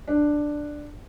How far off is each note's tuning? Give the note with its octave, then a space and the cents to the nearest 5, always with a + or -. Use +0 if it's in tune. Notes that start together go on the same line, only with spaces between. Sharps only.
D4 +5